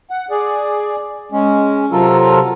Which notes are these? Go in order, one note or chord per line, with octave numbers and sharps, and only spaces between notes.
F#5
G#4 D5
G#3 C#4
C3 F#3 F4 A4 A#4